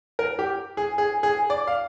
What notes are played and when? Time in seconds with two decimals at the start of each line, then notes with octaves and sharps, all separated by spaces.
0.19 A#4
0.39 G4
0.77 G#4
0.98 G#4
1.23 G#4
1.50 D5
1.67 F5